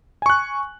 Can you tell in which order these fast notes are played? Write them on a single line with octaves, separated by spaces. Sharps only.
G#5 C#6 F#6